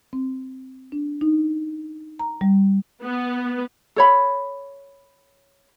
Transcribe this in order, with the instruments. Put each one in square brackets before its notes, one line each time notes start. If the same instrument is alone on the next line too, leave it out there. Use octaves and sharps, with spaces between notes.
[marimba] C4
D4
D#4
A#5
G3
[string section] B3
[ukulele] A4 C#5 B5